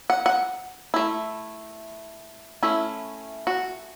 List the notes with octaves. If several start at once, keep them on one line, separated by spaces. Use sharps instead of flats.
F#5
F#5
A3 E4
A3 C#4 E4
F#4